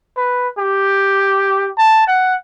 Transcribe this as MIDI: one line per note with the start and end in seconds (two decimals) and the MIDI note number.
0.17 0.48 71
0.59 1.69 67
1.78 2.08 81
2.08 2.34 78